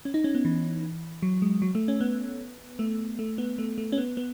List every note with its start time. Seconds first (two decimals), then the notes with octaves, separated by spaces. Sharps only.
0.05 C#4
0.14 D#4
0.24 C#4
0.35 B3
0.45 E3
1.22 F#3
1.42 G#3
1.62 F#3
1.75 A3
1.88 C#4
2.00 B3
2.79 A3
3.19 A3
3.38 B3
3.59 A3
3.78 A3
3.92 C#4
3.98 B3
4.17 B3